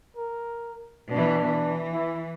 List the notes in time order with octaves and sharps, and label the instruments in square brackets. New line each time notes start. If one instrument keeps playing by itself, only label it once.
[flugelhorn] A#4
[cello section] B2 E3 [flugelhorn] D4
[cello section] E3
[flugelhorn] E4